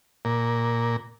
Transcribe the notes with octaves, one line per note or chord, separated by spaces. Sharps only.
A#2